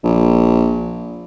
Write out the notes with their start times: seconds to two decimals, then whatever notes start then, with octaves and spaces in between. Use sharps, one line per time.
0.04 A#1